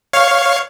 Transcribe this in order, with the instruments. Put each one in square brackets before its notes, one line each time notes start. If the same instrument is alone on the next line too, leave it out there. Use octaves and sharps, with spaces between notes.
[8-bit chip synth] C#5 F5